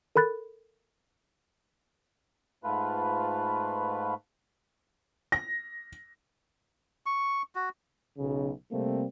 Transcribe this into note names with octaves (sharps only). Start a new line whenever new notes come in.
A4 A#4 B5 F#6 A6
G#2 A3 F4 B4
A#6
C#6
F#4
B1 C#3
C3 G3 A3 A#3 C4